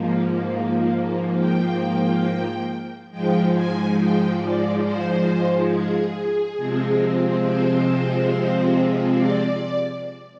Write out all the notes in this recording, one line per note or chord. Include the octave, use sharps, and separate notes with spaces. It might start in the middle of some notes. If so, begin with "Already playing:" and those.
Already playing: G#2 F3 A#3
G5
G#2 F3 G#3 G5
G#5
G5
D5
C5
G#4
C3 F3 G#3 C4
C5
D5